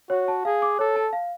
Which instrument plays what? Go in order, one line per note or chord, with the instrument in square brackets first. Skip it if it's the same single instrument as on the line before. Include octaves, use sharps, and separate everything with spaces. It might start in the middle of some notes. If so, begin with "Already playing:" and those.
[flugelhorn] F#4 [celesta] C#5
[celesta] A5
[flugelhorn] G#4 [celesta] F5
[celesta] D6
[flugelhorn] A4 [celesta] C#5
[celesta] A5
F5